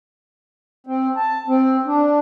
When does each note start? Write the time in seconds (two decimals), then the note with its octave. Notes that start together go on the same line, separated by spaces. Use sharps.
0.87 C4
1.16 A5
1.48 C4
1.86 D4